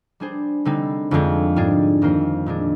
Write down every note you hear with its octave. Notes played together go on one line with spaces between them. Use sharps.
G3 D4 G#4 C5
D3 G3 C4 D#4
F2 D3 G#3 C4
G#2 G3 D4 F4 G#4
F2 D#3 A#3 F4 C5
A#2 G#3 D4 G#4